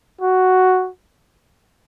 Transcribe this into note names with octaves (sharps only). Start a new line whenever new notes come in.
F#4